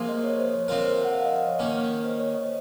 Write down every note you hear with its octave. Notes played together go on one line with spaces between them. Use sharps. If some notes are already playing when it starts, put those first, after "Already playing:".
Already playing: C3 F3 A#3 F4 G#4
D#5
C#5
C5
C#5
C3 F3 C4 F4 A#4
F#5
F5
D#5
D#5
C#5
D#3 A#3 C#4
C5
C#5
D#5